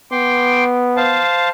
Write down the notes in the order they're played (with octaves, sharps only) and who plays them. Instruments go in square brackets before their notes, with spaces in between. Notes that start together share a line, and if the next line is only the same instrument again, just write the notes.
[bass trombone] B3 [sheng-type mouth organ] G5 C6 D6
[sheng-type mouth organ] C5 F5 A5